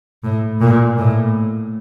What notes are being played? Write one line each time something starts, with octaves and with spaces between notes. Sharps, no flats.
A2
A#2
A2